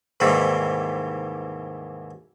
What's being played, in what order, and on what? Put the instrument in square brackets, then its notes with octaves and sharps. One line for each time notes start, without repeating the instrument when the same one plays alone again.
[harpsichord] D#2 G#2 C3 E3 G3 C4